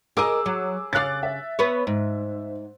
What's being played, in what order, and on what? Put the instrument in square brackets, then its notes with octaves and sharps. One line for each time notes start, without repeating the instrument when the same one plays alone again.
[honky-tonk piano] G#4 D6 E6 [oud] A#4 D#5
[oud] F#3
[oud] C#3 F5 [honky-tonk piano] D6 F#6 A6
[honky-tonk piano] E5
[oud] B3 B4 C#5
G#2